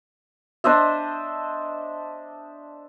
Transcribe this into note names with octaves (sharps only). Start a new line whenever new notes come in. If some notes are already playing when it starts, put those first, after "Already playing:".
D4 C5 D#5 E5